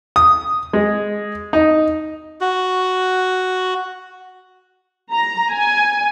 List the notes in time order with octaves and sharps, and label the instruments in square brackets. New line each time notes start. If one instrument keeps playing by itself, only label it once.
[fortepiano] D#6
G#3
D#4
[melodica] F#4
[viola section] A#5
G#5